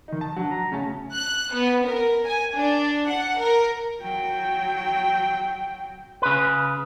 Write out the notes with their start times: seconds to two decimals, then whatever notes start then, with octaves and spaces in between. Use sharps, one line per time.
0.08 D#3 D#4
0.21 A5
0.36 F#3 D4
0.51 A#5
0.72 C#3 A3 C#4 A5
1.16 F#6
1.53 B3
1.88 A#4
2.27 G#5
2.56 D4
3.11 F#5
3.40 A#4
4.01 F#3 G5
6.22 C#3 B4